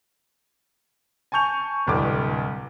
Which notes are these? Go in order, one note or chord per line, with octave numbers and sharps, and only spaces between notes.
G#5 A5 C#6 G6 F7
D1 C2 A2 B4 D6